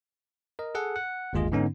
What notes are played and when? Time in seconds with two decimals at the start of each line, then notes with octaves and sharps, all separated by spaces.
0.59 A#4 D#5
0.75 G#4 A4 F#5
0.96 F#5
1.33 G1 D#2 G#3 F4 G#4 D#5
1.52 G#2 D3 B3 C#4 D#4